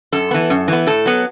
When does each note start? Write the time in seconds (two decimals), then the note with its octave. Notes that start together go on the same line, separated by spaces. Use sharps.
0.12 F#2 A4
0.31 E3 B3
0.50 F#2
0.68 E3 B3
0.86 A2 A4
1.06 F#3 B3